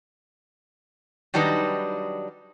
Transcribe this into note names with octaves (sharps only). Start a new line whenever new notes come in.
D#3 F#3 G3 D4 D#4 B4